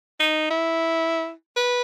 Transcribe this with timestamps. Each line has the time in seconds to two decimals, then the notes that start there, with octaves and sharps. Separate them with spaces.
0.20 D#4
0.50 E4
1.57 B4